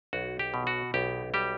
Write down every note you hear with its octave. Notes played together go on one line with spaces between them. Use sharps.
B1 F#4
G4
B2
F#4
B1 G4
G3 G4